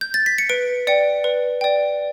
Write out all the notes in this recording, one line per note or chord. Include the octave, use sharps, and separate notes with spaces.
G6
A6
B6
C#7
B4 D7
D5 G5 C#7
B4
D5 G5